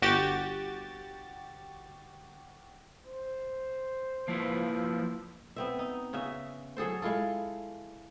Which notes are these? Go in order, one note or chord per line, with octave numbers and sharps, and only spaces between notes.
G1 F#4 G4 A6
C5
F3 A#3 E4 B4
B3 C4 E5
D#4
C#3 C#4 F#4 E5
F#3 G#4 A4 C5
G#3 E4 F4 A4